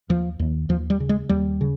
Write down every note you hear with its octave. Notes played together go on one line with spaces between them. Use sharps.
D#2 F3
D#2
D#2 F3
G3
C#3
G#3
D#2 G3
C#3